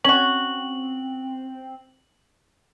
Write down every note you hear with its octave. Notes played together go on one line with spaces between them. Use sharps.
C4 C#4 F#4 F#7